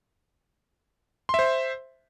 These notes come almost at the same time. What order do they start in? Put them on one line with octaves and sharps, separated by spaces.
C6 E5 C5